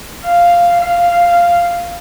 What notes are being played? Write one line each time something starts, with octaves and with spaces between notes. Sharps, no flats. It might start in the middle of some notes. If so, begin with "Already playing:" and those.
F5
F5